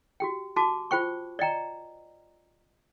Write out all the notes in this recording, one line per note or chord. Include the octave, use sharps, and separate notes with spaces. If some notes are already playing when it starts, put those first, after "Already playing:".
F#4 G4 G5
F#4 A5 D6
F4 C5 G5 C#6
D5 D#5 G5 A#5